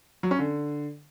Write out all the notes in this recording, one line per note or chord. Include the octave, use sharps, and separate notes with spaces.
F#3
C#4
D3